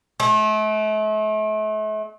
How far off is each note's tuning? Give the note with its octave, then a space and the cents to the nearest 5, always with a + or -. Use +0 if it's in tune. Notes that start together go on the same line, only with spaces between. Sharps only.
A3 -40